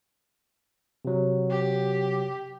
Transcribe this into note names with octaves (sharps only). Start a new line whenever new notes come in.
C3 F#3
G4